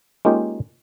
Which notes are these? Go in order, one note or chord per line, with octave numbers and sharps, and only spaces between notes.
G#3 A#3 C#4 D#4 F4 G4